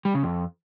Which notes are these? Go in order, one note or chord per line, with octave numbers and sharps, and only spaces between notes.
G3
C#3
F2